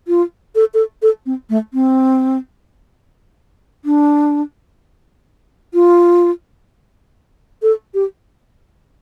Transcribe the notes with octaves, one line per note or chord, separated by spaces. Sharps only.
F4
A4
A4
A4
C4
A3
C4
D4
F4
A4
G4